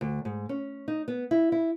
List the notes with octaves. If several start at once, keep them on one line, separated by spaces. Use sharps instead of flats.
D2
G#2
C#4
D#4
B3
E4
E4